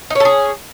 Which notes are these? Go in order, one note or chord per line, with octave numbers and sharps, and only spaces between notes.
C#4 D#4 G#4 A4